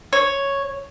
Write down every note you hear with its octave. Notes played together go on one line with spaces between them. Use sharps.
C#5